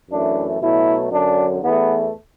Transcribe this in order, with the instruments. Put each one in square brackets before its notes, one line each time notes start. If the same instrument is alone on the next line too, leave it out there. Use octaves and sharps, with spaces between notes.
[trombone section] F#2 E3 A3 D4
B2 F#3 A3 E4
F#2 D3 F#3 D4
E2 E3 A3 B3